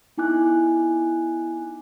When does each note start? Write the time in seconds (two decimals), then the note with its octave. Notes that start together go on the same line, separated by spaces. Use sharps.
0.17 B3 D#4 E4 G#5 D6 F#6